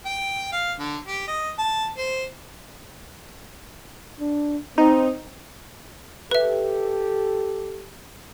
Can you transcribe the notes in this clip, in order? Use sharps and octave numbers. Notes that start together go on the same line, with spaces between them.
G5
F5
D3
G4
D#5
A5
C5
D4
C4 D#4
G4 A4 B4 E5